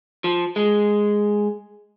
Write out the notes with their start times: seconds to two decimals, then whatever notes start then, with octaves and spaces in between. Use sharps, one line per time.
0.24 F3
0.56 G#3